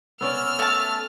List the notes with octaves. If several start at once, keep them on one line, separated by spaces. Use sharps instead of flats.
B3 C#4 D5 E6 F6
A3 A5